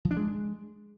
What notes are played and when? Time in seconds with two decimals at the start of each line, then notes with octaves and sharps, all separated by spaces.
0.05 F3
0.11 D4
0.17 G#3